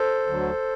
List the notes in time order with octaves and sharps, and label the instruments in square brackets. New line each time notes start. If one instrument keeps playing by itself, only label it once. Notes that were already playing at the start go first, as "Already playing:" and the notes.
Already playing: [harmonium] A4 C5
D2 D3 F#3